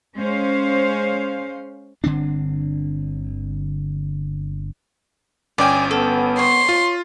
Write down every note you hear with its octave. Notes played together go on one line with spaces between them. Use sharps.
G#3 C#4 C5 F5
G1 D3 C4 D4
G1 C#4 D5 G5 G#5
B3 A4
C#5 C6
F4